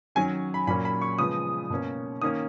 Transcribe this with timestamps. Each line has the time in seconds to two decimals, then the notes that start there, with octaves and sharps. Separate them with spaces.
0.15 D#3 F#3 C#4 G#5
0.54 B5
0.67 A#2 F#3 A#3 C#4 B5
0.85 B5
1.02 C#6
1.19 C#3 F3 G#3 B3 D#6
1.70 B2 A#3 C#4
2.22 D#3 A#3 C#4 D#6